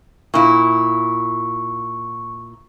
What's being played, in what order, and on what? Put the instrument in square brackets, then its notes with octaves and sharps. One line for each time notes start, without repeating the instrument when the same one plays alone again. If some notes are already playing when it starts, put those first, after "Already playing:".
[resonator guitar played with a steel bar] A#2 E4 [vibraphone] C#6